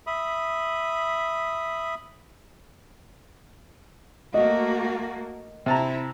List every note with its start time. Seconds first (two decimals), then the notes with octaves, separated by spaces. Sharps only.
0.07 E5 B5 D#6
4.34 A3 A#3 F#4 D#5
5.66 C3 C4 E4 A5 A#5